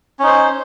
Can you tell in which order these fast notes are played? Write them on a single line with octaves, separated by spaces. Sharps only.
C#4 D#4 C5